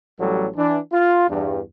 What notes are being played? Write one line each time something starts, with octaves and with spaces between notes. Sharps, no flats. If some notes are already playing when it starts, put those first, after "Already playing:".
A1 F#3 G3 A4
E3 D4
F4
E2 G2